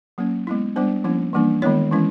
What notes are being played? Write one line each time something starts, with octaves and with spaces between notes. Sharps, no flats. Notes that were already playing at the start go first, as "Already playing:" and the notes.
F#3 A#3 C#4
G#3 B3 E4
G3 B3 D4 C5
F3 A#3 C#4 E4
E3 G3 A#3 D4
D#3 G#3 B3 E4 C#5
E3 G#3 C#4 E4